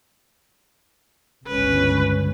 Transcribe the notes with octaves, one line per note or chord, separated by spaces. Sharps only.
G1 C#2 C#4 B4